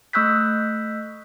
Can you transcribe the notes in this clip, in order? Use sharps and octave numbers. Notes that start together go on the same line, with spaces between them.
A3 C#6 E6 F#6 G6 B6